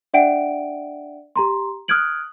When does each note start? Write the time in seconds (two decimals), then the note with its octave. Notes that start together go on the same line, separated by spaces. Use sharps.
0.14 D4 D5 E5 F#5 G5 D7
1.36 G4 A#5 C6
1.88 D#6 F6 F#6 G#6 D7 F#7